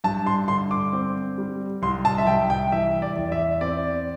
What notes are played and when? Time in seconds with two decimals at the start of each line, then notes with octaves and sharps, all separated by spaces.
0.04 G2 A5
0.26 C6
0.48 D3 C6
0.71 D6
0.93 C4
1.38 G3
1.82 C2 C6
2.05 A5
2.18 E5
2.27 C2 G5
2.50 G5
2.72 E3 E5
3.02 D5
3.16 E2
3.32 E5
3.61 C4 D5